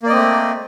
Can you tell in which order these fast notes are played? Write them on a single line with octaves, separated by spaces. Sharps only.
A#3 D5 D#5 C4 A3